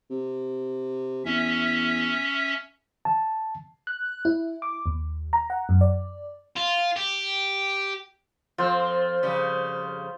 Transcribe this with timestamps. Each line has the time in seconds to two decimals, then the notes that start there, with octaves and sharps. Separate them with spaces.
0.10 C3
1.25 E2 C#4 E5
3.05 A5
3.87 F#6
4.25 E4
4.62 D6
4.86 D#2
5.33 A#5
5.50 F#5
5.69 F#2
5.81 D5
6.56 F4
6.97 G4
8.58 F2 C4 F4 C5
9.23 F2 C#3 G3